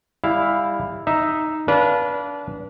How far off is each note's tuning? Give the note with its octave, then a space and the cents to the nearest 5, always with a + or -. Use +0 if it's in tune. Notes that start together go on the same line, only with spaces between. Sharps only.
G3 +35 E4 +0 F5 +5
D#4 +0 E5 +0
D4 -30 B4 -25 F5 +0